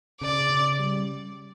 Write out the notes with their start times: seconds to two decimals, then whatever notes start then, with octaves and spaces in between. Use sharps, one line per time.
0.21 C#3 D5
0.50 C#3
0.79 G3